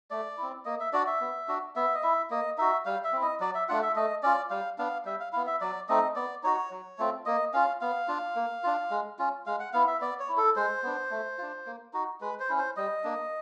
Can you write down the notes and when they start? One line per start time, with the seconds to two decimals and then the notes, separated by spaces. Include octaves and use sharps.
0.10 A3 D5
0.38 C4 E4
0.65 A#3 D#5
0.80 E5
0.93 D4 F#4 D5
1.07 E5
1.21 B3
1.48 D4 F#4
1.75 B3 E5
1.94 D#5
2.03 E4 E5
2.30 A#3 D#5
2.58 D#4 F#4 E5
2.85 G3 F5
3.04 E5
3.13 C4 E4
3.22 D#5
3.40 F#3 D5
3.54 E5
3.68 A3 D4 F4 F#5
3.82 E5
3.96 A3 D#5
4.23 C#4 F4 D5
4.50 G3 F5
4.78 B3 D4 F5
5.05 G3 E5
5.20 F5
5.33 B3 E4 F5
5.47 E5
5.61 F#3 D5
5.89 A3 C4 D#4 D#5
6.16 B3 D5
6.43 D#4 F#4 C#5
6.71 F#3
6.98 A3 C4 F4
7.26 A#3 D#5
7.53 C#4 F4 F5
7.81 B3 F5
8.08 D4 F4
8.36 A#3
8.63 D4 F4
8.90 G#3
9.19 C#4 F4
9.46 G#3 F5
9.60 F#5
9.73 B3 E4 F5
9.87 E5
10.01 B3 D5
10.19 C#5
10.29 E4
10.37 A4
10.56 G#3 C5
10.83 B3 D4
11.11 A3
11.38 D4 F4
11.66 A#3
11.93 D#4 F#4
12.21 G#3 B4
12.40 C5
12.49 C#4 E4
12.58 C5
12.76 G3 D#5
13.04 A#3 D4